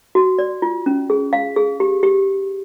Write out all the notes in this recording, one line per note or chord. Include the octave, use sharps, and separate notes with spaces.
F#4
D5
F4
C#4
G#4
F5
G#4
G4
G4